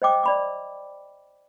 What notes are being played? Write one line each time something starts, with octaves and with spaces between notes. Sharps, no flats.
C5 D#5 G5 D6 D#6
D5 B5 D6